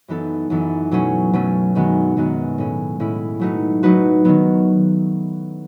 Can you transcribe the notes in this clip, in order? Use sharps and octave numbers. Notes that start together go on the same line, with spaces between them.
F#2 E3 B3 D#4 A4
F#2 E3 B3 D#4 A4
B2 F#3 A3 C#4
B2 F#3 A3 C#4
F#2 D#3 G#3 B3 F#4
F#2 D#3 G#3 B3 F#4
A2 G#3 C#4 E4
A2 G#3 C#4 E4
F#3 A3 D#4 F#4 B4
F#3 A3 D#4 F#4 B4
D#3 F#3 B3